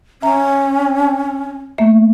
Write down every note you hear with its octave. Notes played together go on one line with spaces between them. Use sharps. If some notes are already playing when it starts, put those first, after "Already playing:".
C#4 E5 A#5
A3 A#3 E5